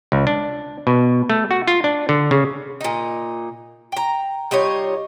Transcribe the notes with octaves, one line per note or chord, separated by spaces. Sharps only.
C#2
D4
B2
A3
F#4
F4
D4
D3
C#3
A#2 D#4
G5 A#5
G3 D#4 F4 C#5